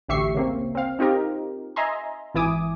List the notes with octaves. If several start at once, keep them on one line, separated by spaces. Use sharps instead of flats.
A1 D2 G4 E5 C#6 C7
C#3 A#3 C4
C4 F5
C4 D#4 F4 G4 A#4
D#5 E5 G#5 A#5 C6
G#1 E3 E4 G#5 D6 D#6